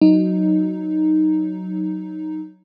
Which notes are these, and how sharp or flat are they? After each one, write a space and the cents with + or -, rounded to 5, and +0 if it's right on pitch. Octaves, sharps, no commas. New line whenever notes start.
F#3 +5 D#4 +0